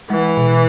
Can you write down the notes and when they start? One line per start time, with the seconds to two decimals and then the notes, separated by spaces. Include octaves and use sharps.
0.10 E3 G#3
0.37 B2